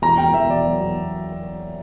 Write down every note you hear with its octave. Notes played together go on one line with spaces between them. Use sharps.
E2 A#5
E2 G5
E2 E5
E2 D5
F#3
E2